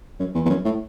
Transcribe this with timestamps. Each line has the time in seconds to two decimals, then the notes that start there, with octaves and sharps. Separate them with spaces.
0.20 F#2
0.35 E2
0.45 E2
0.50 F#2
0.65 A2